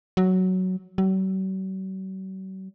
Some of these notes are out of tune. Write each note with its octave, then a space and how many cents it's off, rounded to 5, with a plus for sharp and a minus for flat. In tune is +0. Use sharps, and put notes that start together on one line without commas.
F#3 +5
F#3 +45